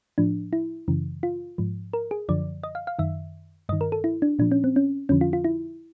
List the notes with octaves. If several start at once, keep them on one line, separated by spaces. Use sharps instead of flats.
A2 F3 D4
E4
F#2 C#3 E3
F4
G#2 F3
A#4
G#4
F#2 D3 F3 D5
D#5
F5
F5
F#2 D#3 E5
G2 D#3 D#5
A#4
A4
E4
D4
A#2 F3 D4
C#4
C4
C#4
F2 D3 F3 C#4
F4
F4
E4